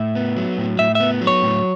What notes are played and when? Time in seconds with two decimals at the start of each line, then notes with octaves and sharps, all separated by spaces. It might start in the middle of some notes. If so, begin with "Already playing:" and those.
Already playing: A2 E5
0.15 B3
0.37 F#3
0.58 A2
0.79 A2 E5
0.95 B3 E5
1.21 F#3
1.27 C#5
1.43 A2